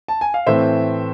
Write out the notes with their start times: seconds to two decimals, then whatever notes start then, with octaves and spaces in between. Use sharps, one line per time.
0.08 A5
0.21 G#5
0.34 F5
0.46 A2 E3 A3 C4 C5 E5